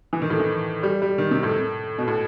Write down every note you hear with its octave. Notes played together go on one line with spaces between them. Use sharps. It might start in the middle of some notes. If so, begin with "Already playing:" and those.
E3
D#3
A2
E3
G3
G3
D#3
C3
A2
B2
A2